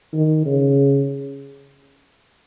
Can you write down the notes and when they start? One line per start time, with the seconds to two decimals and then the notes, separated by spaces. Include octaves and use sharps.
0.14 D#3
0.46 C#3